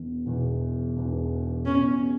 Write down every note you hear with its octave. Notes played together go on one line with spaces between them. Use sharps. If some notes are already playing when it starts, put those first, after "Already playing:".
Already playing: E1 E2 B2
E1 E2 B2
E1 E2 B2
E1 E2 B2 C#4